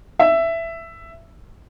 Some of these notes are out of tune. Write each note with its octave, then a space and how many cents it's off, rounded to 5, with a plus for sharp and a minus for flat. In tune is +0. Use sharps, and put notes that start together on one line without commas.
E5 +10